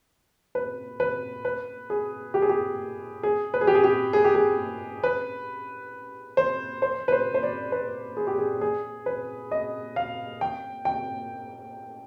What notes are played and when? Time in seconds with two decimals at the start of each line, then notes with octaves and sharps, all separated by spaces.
0.55 B4
1.00 B4
1.45 B4
1.90 G#4
2.34 G4
2.42 G#4
2.49 G4
3.23 G#4
3.54 B4
3.61 G#4
3.67 G4
3.75 G#4
3.84 G4
4.13 G#4
4.24 G4
4.35 G#4
5.04 B4
6.37 C5
6.82 C5
7.08 B4
7.12 C5
7.34 C5
7.43 D5
7.72 B4
8.17 G#4
8.27 G4
8.38 G#4
8.61 G#4
9.06 B4
9.52 D#5
9.96 F5
10.41 G5
10.85 G5